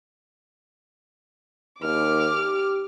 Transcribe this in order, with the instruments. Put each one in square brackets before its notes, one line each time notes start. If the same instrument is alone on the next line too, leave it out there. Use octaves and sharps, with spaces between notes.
[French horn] D#2 [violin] D6 F6
[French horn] G4